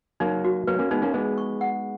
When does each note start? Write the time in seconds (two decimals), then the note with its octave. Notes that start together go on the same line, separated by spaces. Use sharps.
0.20 F#3 A#3 D#4
0.45 F#4
0.67 F#3 A#3 B4
0.79 A#3 C#4
0.91 G#3 B3 D#4
1.02 A#3 C#4
1.14 G#3 B3 G#4
1.38 C#6
1.61 F#5